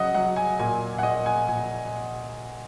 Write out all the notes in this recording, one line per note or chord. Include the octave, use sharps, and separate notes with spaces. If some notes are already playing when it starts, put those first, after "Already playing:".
Already playing: C#3 F#3 D#5 F#5
F#3 F#5
G#5
A#2 G#5
F#5
A#2 D#5
G#5
A#2 G#5